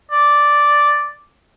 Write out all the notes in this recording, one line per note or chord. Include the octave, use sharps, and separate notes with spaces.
D5